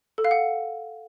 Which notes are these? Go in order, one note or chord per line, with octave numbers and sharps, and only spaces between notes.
A4
F5
F#5